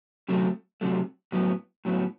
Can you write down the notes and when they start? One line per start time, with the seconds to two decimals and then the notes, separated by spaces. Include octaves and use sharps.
0.28 C3 F#3 A3
0.81 C3 F#3 A3
1.32 A2 F#3 B3
1.85 A2 F#3 B3